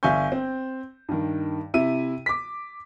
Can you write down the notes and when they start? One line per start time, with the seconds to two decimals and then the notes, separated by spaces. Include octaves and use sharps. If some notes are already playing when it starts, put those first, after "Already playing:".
0.03 G1 E5 F5 G#5 C#6 G6
0.32 C4
1.09 G2 D#3
1.74 C3 E4 E5 D#7
2.26 D6 B6